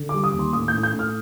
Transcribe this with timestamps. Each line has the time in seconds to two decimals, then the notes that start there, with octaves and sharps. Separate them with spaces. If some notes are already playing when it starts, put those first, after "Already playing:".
Already playing: D3
0.09 D6
0.14 G3
0.24 D#6
0.34 D#2
0.39 C6
0.53 A2 D#6
0.68 G6
0.73 A2
0.83 G6
0.94 A2
0.99 F6